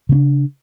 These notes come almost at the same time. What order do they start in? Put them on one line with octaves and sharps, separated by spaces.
C#3 C4 D4